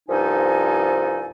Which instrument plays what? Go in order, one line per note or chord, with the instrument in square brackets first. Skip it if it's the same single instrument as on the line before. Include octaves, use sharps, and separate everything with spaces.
[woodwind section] C2 G2 F3 D#4 A4 G#5